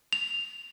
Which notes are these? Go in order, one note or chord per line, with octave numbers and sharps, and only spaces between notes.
F7